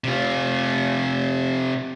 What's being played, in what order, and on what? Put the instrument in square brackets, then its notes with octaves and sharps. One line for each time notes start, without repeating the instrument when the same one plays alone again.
[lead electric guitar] C3 F4